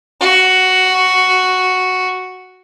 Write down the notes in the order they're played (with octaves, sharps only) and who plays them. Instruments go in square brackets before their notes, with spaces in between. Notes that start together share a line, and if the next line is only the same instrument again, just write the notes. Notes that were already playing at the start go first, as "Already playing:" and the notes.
[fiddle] F#4